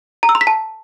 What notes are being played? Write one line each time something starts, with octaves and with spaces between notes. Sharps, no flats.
A#5
E6
C6
B6
A5